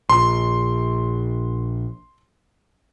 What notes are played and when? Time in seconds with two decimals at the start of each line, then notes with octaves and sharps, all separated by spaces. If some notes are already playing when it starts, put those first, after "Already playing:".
0.10 A#1 C6